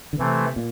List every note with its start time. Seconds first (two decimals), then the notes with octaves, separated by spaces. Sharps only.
0.13 D3
0.19 C3 E3 A3 C4
0.56 A#2